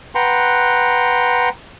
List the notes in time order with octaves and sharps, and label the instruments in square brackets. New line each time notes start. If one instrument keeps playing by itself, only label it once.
[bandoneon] B4 F#5 G5 A#5 C6